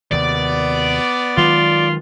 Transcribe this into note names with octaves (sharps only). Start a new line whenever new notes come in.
D#2 C3 D#3 B3 D5
D#3 F#3 G#3 F4